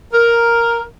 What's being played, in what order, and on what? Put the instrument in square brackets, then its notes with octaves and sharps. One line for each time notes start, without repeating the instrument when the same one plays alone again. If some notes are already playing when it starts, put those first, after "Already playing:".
[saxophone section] A#4